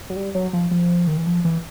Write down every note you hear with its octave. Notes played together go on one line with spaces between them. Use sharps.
F#3
G3
F#3
F3
F3
D#3
E3
F3
E3